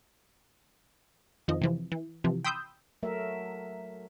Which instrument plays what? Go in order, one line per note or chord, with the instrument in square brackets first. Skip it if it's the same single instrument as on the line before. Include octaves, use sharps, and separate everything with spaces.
[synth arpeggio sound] F2 D#3 F3 D#5
C3 E3 F3
E3
C3 E3 F3
G5 B5 C6 D#6 E6 G6
[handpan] F#3 A3 A#4 E5